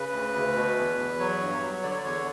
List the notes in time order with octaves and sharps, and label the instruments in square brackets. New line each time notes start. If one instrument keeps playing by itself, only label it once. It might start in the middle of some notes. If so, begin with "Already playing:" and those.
Already playing: [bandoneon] C#3 B4
D2
D2
B2
E2
E2
F#3 C#5
G2
F#3
D3 D5
C#5
D5
E2 C#5